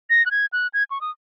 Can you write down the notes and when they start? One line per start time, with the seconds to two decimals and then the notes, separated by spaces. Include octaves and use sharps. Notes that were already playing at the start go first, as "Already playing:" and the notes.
0.10 A#6
0.26 F#6
0.31 G#6
0.53 F#6
0.74 G#6
0.91 C#6
1.01 D#6